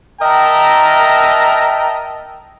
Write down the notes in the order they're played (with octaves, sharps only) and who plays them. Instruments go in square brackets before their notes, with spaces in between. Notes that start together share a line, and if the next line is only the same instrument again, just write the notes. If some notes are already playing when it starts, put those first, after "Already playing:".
[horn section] A#4 D#5 E5 G5 A5 A#5